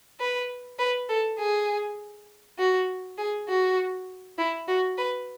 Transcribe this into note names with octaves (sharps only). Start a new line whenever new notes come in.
B4
B4
A4
G#4
F#4
G#4
F#4
E4
F#4
B4